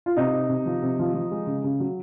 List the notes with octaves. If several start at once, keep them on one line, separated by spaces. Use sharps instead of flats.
F4
C3 D#4
C3
C3
F3
C3
F3
F3
G#3
C#3
C#3
F#3